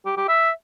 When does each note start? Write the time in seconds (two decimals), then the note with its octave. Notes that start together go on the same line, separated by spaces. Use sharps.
0.06 G4
0.17 G4
0.28 E5